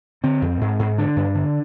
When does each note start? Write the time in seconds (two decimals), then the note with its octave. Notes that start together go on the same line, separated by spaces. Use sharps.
0.24 D3 C4
0.42 F2
0.61 G#2
0.79 G#2
0.98 D3 D4
1.16 G2
1.35 D3